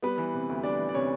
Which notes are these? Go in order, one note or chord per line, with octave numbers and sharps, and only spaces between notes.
G3 B3 B4
E3
C3
D2
G3 D4 D5
E3
D5
C3 C#4 C#5